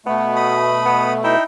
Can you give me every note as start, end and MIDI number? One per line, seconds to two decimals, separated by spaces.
0.06 1.36 47
0.06 1.36 57
0.06 0.70 59
0.36 1.13 83
0.36 1.13 87
0.86 1.15 59
1.24 1.44 63
1.24 1.42 64
1.24 1.44 79